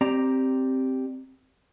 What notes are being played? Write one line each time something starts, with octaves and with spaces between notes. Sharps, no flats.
C4 G4 D5 A#5